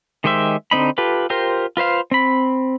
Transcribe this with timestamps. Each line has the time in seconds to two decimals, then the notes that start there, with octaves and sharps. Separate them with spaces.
0.24 D#3 G#3 G4 C5 E5
0.71 D3 C4 D#4 B5
0.98 F4 G4 A4 B4
1.30 F4 G4 A#4 C5
1.77 F4 B4 C5 F5
2.11 C4 B5